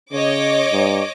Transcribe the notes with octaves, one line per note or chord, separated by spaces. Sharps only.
C#3 C#5 D#5 D6
G2